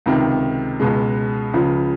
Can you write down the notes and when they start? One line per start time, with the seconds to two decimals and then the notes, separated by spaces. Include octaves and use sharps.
0.06 C#2 C3 D#3
0.80 C#2 B2 G#3
1.53 C#2 C#3 F3